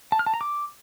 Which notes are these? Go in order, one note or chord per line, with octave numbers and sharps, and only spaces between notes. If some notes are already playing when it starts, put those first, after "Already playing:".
A5
F6
A5
A#5
D6